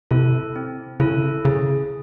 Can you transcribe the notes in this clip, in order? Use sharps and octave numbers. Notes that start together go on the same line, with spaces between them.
C3 E4 A4
C4
C#3 E4 A4
C#3 G#4